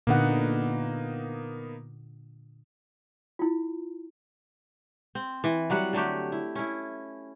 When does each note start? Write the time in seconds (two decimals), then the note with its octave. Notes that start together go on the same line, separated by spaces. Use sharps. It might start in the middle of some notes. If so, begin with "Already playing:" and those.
0.07 A#2 D3 A#3 B3 D#4 F#5
3.39 E4 F4
5.15 C4
5.44 E3
5.70 F#3 G3 F#5
5.93 D3 F#3 A3 G4
6.32 E4
6.55 C#4 E4